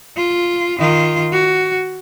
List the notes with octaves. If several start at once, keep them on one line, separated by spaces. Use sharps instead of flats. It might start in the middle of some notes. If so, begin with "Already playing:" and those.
F4
D#3 F4
F#4